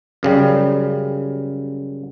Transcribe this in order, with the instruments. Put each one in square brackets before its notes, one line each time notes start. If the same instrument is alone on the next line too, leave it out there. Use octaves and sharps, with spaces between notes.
[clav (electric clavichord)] F#2 C#3 G3